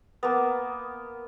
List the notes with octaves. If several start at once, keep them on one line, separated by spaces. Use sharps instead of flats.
A#3 B3